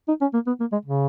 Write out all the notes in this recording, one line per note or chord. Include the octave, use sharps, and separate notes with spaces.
D#4
C#4
A#3
B3
A#3
G#3
C#3